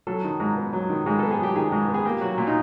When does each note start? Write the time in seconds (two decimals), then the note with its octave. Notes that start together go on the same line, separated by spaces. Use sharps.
0.07 F#3 A4
0.24 D#3
0.40 G#2
0.57 B3
0.73 F#3
0.89 D#3
1.06 G#2 G#4
1.19 B3 A4
1.31 G#4
1.39 F#3 G4
1.56 D#3 G#4
1.72 G#2
1.88 B3
1.94 G#4
2.05 A#3 G4
2.21 F#3 F#4
2.38 A#2 F4
2.47 D#4